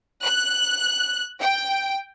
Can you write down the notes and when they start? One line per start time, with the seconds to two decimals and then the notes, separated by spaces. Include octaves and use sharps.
0.24 F#6
1.40 G5